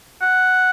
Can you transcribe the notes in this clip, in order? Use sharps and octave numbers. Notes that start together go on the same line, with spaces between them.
F#5